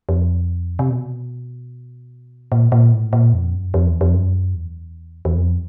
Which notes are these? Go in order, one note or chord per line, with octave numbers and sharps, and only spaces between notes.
F2
C3
B2
A#2
A#2
A2
A#2
F2
F#2
F2
E2
F2
F#2
E2
E2
F2